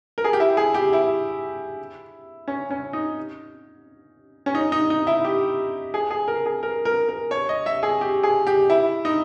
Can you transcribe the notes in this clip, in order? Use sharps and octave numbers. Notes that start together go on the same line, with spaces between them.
A#4
G#4
G4
E4
G#4
G4
E4
C#4
C#4
D#4
C#4
D#4
D#4
D#4
E4
G4
G#4
G#4
A#4
G#4
A#4
A#4
A#4
C#5
D#5
E5
G#4
G4
G#4
G4
E4
D#4